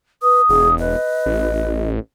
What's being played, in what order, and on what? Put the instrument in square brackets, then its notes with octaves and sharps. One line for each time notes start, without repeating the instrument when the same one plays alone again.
[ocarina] B4 [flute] D#6
[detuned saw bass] E1 [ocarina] G#4
[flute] B4 [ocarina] D#5
[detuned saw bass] A1